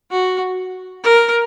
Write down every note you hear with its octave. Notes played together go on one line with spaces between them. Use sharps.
F#4
A#4